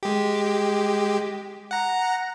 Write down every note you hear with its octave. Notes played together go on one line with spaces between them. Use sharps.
G#3 G4
F#5 A#5